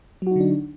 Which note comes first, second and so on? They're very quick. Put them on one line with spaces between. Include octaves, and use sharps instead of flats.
F#3 F#4 D#4 D3 D4